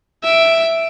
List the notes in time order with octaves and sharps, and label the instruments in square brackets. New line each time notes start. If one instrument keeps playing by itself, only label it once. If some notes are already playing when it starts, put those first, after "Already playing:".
[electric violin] E5 D7